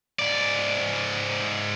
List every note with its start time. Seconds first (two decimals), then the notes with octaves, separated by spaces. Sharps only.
0.19 G#2 D5